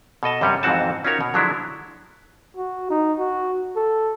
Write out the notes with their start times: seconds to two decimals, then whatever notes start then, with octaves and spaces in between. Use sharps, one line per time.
0.23 B2 A4 D#5 A5
0.41 F#2 C3 G3 B4 C#5
0.63 F2 G#2 E3 C4 F#4 A5
1.04 C#4 D#4 F4 F#4 A#4 C#5
1.21 B2
1.34 D3 F3 F#3 G#3 D4 E4
2.57 F#4
2.90 D#4
3.19 F#4
3.76 A4